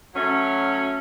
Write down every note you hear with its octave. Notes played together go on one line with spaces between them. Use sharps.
F#3 A3 C#4